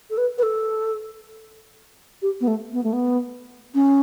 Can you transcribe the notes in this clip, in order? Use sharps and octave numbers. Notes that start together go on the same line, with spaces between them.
A4
B4
B4
A4
G4
B3
A3
B3
A3
B3
C#4